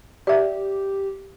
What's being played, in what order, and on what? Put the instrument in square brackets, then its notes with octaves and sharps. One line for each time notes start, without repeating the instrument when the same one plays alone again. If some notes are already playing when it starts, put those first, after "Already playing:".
[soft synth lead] G4 [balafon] D5 E5